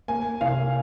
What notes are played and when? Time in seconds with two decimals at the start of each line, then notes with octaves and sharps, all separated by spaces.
0.08 A#3 G#5
0.41 C2 F5